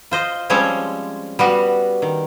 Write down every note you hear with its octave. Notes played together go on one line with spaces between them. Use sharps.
F4 C5 D#5
F3 G3 G#3 C4 C#4 C#5
G3 B3 F#4
D#3